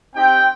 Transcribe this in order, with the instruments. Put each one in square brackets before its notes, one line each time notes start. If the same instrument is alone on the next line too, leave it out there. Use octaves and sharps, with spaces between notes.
[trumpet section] C4 D#4 G4 G5